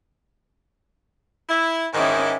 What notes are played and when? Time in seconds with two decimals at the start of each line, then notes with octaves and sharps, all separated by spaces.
1.49 E4
1.94 G#2 D#3 C#4 E4 D6